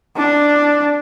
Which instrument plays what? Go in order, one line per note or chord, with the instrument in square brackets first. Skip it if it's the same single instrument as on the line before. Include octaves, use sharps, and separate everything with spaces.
[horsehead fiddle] D4